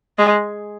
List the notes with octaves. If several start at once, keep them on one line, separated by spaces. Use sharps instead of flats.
G#3